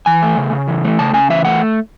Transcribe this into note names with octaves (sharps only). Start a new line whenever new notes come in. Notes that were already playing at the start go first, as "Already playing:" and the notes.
E3 G#5
A3
C#3
C#3
E3
A3
C#3 A5
C#3 G#5
E3 E5
A3 F#5